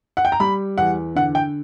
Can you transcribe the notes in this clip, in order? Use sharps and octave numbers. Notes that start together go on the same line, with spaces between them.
F#5
G5
A#5
G3 B5
E2 F#5
D3 F#5
G5